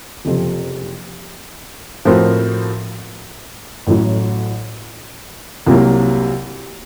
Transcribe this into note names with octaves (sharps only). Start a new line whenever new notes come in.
F#1 F2 C3 F3
A2 F3 C4 F#4 A#4
A1 A2 F#3
C2 C3 F#3 A#3